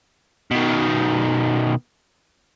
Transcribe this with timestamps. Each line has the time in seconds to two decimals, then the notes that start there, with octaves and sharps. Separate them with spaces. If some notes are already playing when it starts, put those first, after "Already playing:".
0.51 B2 D#3